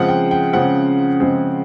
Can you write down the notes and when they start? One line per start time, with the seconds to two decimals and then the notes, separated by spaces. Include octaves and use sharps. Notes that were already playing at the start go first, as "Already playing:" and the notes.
Already playing: C#3 F3 G#3 C4 F#5
0.09 G5
0.31 G5
0.53 C#3 F3 G#3 C4 F#5
1.20 C#3 F3 G#3 C4